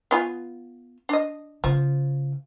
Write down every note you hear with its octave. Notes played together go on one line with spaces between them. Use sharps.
B3 F4 G#5
D4 D#5
C#3 F3